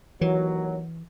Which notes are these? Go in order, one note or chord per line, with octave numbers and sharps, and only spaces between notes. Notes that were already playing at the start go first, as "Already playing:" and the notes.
D#2 E3 F#3